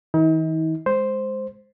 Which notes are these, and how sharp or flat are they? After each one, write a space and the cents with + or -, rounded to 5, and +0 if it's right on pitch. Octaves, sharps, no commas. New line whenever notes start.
E3 -45 D#4 +40
G#3 +0 C5 +0